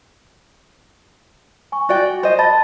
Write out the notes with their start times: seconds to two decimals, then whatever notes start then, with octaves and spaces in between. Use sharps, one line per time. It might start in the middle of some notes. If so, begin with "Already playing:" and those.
1.72 G#5 C#6
1.89 F#4 D5 G5
2.23 C5 D#5
2.39 D#5 A5 B5 A6